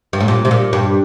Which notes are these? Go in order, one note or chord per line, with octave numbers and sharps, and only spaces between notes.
G2
A2
A#2
C3
A#2
G2